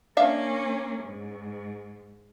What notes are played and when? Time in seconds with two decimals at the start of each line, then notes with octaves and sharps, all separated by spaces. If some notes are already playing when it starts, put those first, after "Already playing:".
0.17 A#3 C#4 D4 E5 F5
1.04 G#2